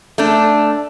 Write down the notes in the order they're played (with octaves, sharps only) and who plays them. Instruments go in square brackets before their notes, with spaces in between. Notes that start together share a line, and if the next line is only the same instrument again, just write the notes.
[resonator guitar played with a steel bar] A3 D4